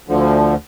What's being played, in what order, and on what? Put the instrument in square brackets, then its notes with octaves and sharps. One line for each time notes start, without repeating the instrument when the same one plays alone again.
[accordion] D2 D3 F3